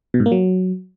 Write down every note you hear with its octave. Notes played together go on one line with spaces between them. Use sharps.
B2
G#2
A#3
F#3